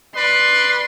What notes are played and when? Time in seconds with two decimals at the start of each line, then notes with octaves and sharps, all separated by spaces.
0.16 B4 D5 C6